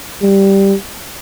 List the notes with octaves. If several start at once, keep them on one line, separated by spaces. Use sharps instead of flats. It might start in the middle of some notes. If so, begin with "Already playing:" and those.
G3